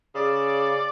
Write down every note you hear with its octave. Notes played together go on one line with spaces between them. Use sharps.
C#3 D5